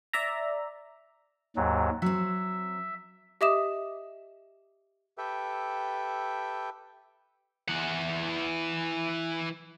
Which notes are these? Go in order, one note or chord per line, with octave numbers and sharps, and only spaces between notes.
D5 E5 A#5
D#2 G#2 F#3
F#3 C4 E5
G4 D#5 E5 D6 D#6 E7
G4 A4 B4 E5 G5
E3 F#5